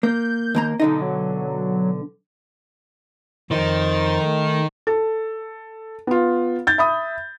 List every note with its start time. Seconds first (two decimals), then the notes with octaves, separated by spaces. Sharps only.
0.03 A#3 G6
0.55 D#2 A#3 A#5
0.80 B1 D3 D#4 D#5
1.01 F#3
3.51 F2 D#3 D#4 C5 A6
4.21 A3
4.87 A4
6.07 B3 F4
6.67 G6 A6
6.78 E5 B5 D#6